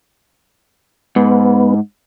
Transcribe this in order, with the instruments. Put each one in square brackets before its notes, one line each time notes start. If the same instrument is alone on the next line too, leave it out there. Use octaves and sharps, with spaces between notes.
[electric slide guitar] G#2 [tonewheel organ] B3